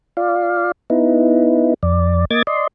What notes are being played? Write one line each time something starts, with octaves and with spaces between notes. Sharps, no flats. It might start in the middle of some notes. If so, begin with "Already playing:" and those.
F4 D5 F5
B3 D#4 E4
F2 D5
A#3 D#5 D6 G#6 A6
D5 D#5 C6